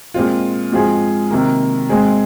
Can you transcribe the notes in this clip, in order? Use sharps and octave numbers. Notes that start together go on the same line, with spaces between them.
A#2 G#3 C4 F4
G#2 F3 C4 F4 G#4
C3 D#3 A#3
G#2 G#3 C4 G#4